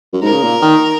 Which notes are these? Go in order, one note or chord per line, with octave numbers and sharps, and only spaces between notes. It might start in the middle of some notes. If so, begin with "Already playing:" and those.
F#2
G#2 A#4
C#3
A#2
D#3